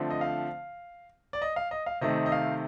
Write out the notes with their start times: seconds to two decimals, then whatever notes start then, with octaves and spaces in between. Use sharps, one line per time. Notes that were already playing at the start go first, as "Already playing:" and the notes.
Already playing: D3 F3 A3 C4
0.10 D#5
0.21 F5
1.33 D5
1.42 D#5
1.56 F5
1.71 D#5
1.86 F5
2.01 C3 D#3 A3 C4 D#5
2.26 D#5
2.32 F5